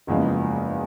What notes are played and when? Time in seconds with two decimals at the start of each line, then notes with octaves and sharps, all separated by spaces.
0.07 F#1 E2 C#3 F3 G#3